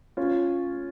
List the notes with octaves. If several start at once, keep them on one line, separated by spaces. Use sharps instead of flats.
C#4 F4